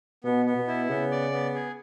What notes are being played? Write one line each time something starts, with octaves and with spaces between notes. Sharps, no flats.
B2 B3
B3
B2
E4
C#3 B3
D5
B3
G#4